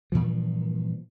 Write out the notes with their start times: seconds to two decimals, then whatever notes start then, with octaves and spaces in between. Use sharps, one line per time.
0.12 G2 A#2 E3 F3